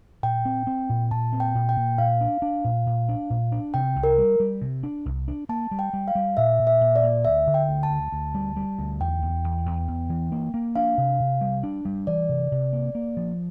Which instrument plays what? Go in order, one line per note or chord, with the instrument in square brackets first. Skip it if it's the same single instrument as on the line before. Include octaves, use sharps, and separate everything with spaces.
[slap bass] A#2 [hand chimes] G5
[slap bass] C4
C4
A#2
[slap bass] A#2 [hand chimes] A5
[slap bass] C4
[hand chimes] G5
[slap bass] A#2
[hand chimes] G5
[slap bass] A#2
[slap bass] A#2 [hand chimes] F5
[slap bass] D4
D4
A#2
A#2
D4
A#2
D4
[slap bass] C3 [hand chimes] G5
[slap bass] C2
[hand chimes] A#4
[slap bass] G3
G3
C3
D4
C2
D4
[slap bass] A#3 [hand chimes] A5
[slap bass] G3
[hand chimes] G5
[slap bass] G3
[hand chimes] F5
[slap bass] G3
[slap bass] A#2 [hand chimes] E5
[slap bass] A#2
[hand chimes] E5
[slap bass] A#2
[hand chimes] D5
[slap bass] A#2
[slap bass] D2 [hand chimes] E5
[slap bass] D3
[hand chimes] G5
[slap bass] D2
[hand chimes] A5
[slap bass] D2
D2
G3
G3
D2
[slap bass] E2 [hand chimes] G5
[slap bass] E2
E2
E2
E2
E3
A#3
A#3
[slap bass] D4 [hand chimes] F5
[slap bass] C3
C3
G3
D4
G3
[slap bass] E3 [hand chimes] D5
[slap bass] C3
C3
A#3
A#3
F3